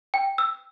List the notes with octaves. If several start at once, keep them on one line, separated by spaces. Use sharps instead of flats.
G5
E6